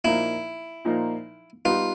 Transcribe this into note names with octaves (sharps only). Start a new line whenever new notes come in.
A#2 F3 A#3 D#4 E4
A#2 F3 A#3 D#4
G3 B3 D#4 F4